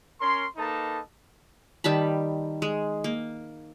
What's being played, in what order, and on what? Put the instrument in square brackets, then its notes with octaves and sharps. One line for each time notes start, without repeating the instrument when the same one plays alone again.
[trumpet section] C#4 A#4 C#5 C6
A#3 D#4 A4 B4 D#5 A5
[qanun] D#3 G3 A5 B5
G#3
A#3